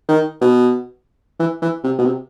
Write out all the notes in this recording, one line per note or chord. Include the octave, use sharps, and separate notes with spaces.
D#3
B2
E3
E3
C3
B2
C3